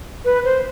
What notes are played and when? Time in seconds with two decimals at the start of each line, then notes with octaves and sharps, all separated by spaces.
0.25 B4
0.44 C5